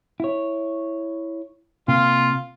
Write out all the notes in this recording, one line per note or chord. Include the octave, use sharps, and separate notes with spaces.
E4 C#5
C3 A#3 F4